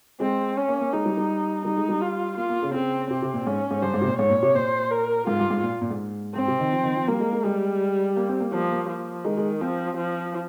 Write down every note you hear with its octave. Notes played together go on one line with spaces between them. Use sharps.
G#3 C4
C#4
A#3
A#3
G#3 D#4
G3
G3
G3 D#4
G#3
G3
F4
A#3 F4
A#3
C#3
C#3 C4
C3 C4
C3
A#2
G#2 C#4
G#2
G2 C5
G#2
C3
A#2
G#2 C#5
A#2
C3
A#2 C5
A#4
G#2 F4
G2
G#2
A#2
A#2
G#2
G#2 C4
C3
D#3
F3
D#3
F3
G3 A#3
G#3
G#3
G3 G#3
A#3
C4
A#3
F3 A#3
A#3
F3
D#3 G#3
G#3
F3 C4
F3